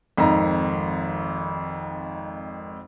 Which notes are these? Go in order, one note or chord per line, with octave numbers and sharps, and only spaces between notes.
G#1 F2 D#3 A#5